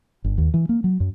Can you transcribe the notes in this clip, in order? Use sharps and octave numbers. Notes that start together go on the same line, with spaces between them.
G1
D#2
E3
A#3
F#3
F#2